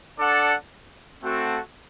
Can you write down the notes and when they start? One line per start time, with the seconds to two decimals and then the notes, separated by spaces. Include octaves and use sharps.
0.18 D4 A4 D5 F#5
1.22 A3 C4 F#4 A4